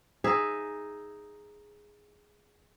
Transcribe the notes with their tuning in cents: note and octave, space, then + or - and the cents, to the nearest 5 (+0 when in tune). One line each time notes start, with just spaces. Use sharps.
D#4 +0 G#4 +0 E5 +0